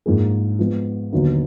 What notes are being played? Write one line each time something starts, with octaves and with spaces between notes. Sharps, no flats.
G#2 F3 A#3 D#4 G#4
F3 G#3 B3
D#2 D3 F#3 B3 D#4